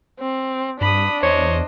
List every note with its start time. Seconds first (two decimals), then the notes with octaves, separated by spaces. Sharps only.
0.20 C4
0.81 G2 D4 B5 D#6
1.23 E2 C5 C#5 D#5